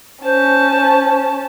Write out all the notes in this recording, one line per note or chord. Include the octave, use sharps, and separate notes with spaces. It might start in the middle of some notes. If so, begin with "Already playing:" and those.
C#4 C5 A5